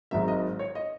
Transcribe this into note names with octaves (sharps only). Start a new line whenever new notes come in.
G#1 G#2 D#3 F#3 E5
D#5
C#5
D#5